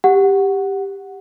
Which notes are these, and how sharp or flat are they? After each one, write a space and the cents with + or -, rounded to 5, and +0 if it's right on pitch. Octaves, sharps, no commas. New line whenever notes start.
G4 +5 F#5 +0